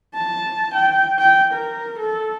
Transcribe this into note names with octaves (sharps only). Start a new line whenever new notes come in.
A5
G5
G5
A#4
A4